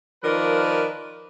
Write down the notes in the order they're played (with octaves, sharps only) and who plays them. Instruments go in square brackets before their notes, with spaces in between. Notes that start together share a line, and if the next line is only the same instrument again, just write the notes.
[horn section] D#3 F3 A#4 B4 D5